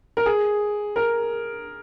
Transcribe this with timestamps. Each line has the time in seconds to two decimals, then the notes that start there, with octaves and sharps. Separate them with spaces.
0.17 A#4
0.26 G#4
0.96 A#4